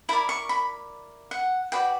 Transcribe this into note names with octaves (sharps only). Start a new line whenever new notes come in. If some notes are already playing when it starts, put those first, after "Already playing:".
E4 A#4 D5 B5
C#6
B5
F#5
F#4 B4 D5 G5